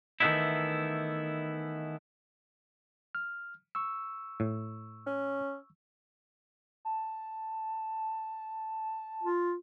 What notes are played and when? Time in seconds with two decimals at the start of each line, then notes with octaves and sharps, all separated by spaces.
0.20 D#3 E3 A3 B3 D#4 E4
3.15 F6
3.75 C#6 E6
4.40 A2
5.07 C#4
6.85 A5
9.23 F4